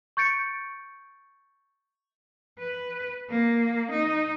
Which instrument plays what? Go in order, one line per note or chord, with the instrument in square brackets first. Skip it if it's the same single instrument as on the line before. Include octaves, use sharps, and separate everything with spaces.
[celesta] C#6 G6 A6 C#7 D7
[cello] B4
A#3
D#4